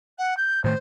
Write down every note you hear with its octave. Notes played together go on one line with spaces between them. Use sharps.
F#5
G6
A2 D#3 A3 C5